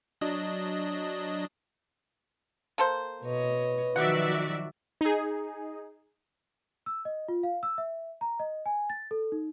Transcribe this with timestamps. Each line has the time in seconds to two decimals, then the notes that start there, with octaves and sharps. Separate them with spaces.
0.21 F#3 D4 D#5
2.78 A#3 A4 C5
3.23 B2 B4 C#5 D#5
3.96 D#3 F3 F#3 F#4 D5 E5 F#5
5.01 D#4 G#4
6.86 E6
7.05 D#5
7.28 F4
7.43 F5
7.63 E6
7.78 E5
8.21 A#5
8.40 D#5
8.66 G#5
8.90 A6
9.11 A4
9.32 D#4